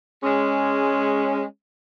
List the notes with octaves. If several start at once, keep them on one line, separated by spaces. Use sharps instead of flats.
G#3 C#4